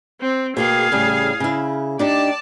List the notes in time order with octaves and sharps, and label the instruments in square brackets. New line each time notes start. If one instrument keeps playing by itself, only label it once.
[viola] C4
[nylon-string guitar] B2 A#3 G5 [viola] G#4 F5
[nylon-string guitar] A2 C#3 G3
C#3 E4
[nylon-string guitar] D4 D#4 G4 [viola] D5 A5